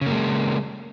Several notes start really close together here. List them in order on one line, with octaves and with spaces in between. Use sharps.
C#3 A#3 G#3